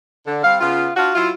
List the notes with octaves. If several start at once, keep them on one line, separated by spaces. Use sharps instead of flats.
D3
G3 C4 F5
C#3 B3 F4
D4 F4 F#4
F#3 E4 F4